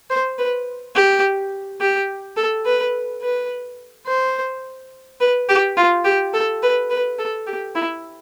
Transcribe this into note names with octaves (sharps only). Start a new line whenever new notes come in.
C5
B4
G4
G4
A4
B4
B4
C5
B4
G4
F4
G4
A4
B4
B4
A4
G4
E4